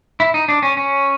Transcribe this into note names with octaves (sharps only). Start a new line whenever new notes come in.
E4
D#4
D4
C#4
C#4